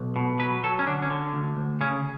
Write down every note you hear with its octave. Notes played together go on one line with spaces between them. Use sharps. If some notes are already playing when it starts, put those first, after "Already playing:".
Already playing: B1
B2
F#3 B4
F#3 A4
C#4
D3 D4
C#4
D3
D2
D2
C#3 C#4